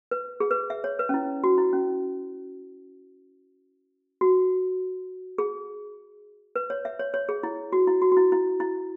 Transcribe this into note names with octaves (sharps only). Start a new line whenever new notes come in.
B4
G#4
B4
E5
C#5
B4
C#4
E4
F#4
E4
C#4
F#4
G#4
B4
C#5
E5
C#5
C#5
G#4
E4
F#4
E4
F#4
F#4
E4
E4
E4